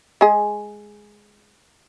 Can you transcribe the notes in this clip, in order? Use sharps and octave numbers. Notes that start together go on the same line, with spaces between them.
G#3 G#4